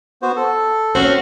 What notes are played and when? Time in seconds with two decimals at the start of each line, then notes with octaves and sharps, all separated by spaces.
0.22 B3 F#4 C5
0.36 A4
0.95 C4 C#4 F#4 C5